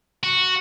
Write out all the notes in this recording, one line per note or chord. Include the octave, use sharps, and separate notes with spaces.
F#4